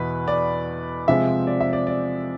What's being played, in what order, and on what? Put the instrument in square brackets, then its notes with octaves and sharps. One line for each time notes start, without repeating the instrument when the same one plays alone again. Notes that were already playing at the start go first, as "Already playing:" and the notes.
Already playing: [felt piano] E2 B2 B3 E4 [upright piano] B4
[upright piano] D5
[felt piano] C3 F3 G#3 C4 [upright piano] E5
[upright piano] D5
E5
D5
D5